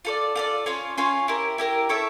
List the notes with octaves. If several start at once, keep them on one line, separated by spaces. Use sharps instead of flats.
F4 A4 D5
F4 A4 D5
C#4 F4 C#5
C#4 F4 C#5
E4 G4 A#4
E4 G4 A#4
E4 A4 C#5 E5